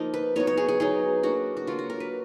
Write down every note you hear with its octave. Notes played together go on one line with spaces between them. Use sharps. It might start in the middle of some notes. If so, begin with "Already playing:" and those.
Already playing: F3 A#3 D#4
B4
F#3 B3 D#4 C#5
C#5
G#4
G#4
F#3 B3 D#4 G#4
F#3 A#3 D4 F#4
F#4
F#3 A#3 D4 F4
F#4
A#4
B4